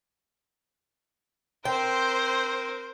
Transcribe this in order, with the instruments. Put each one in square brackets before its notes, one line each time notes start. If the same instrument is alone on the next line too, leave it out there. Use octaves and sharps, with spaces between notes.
[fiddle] C4 A#4 [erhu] C5 [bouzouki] G5